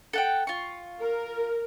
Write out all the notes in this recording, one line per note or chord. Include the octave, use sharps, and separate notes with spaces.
A4 F#5 G5
F4 C#6
A#4